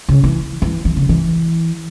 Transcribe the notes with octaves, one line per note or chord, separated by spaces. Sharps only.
C#3
E3
E3
E3
C#3
E3